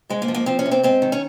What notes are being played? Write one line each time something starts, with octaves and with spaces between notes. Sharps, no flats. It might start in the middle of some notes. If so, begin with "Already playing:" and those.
G#2 G#3
A#3
F3
A#3
F3 C4
C#4
C3
C4
G#2 C4
D#3
C#4